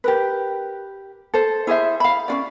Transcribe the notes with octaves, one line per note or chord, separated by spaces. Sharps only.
G4 A#4 B4
A4 C5
E4 G#4 C5 E5
F5 B5
C#4 F4 D5